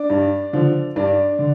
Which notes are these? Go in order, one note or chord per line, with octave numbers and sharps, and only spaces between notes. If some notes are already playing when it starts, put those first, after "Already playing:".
Already playing: D4 D5
G2
D3 F3
G2 D4 D5
D3